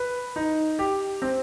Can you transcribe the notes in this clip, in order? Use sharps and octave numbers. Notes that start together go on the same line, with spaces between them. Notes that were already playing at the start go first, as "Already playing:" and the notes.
Already playing: B4
D#4
G4
C4